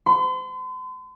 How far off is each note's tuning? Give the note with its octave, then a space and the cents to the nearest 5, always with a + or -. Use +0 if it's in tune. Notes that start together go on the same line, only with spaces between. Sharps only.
C6 -40